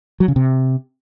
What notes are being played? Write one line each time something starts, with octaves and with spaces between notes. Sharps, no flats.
F#3
C#3
C3